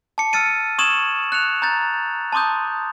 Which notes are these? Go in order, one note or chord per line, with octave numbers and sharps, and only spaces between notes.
A5 D6 C#7
E6 F6 A6 C#7 D#7
C#6 D#6 E6 G#6 E7 F#7
F#6 C#7 F7
A#5 G6 A6
A5 C6 D6 D#6 G6